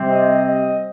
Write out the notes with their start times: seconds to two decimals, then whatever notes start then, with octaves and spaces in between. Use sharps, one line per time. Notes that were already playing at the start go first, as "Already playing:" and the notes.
Already playing: C3 G3 C4
0.09 D#5
0.45 D#5